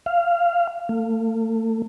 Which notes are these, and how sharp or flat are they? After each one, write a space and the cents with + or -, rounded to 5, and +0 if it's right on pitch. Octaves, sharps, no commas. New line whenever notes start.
F5 -15
A3 +35